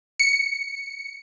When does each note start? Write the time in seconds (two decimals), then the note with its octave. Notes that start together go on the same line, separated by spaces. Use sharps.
0.20 C#7